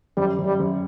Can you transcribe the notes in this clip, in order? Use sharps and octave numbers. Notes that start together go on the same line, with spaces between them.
F#2 G3
F#2
G3
F#2